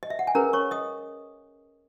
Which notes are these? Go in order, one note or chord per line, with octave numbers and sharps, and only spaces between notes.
D#5
E5
F#5
G#5
C#4 G#4 A#4 B4 A#5
C#5 C#6
D#5 D#6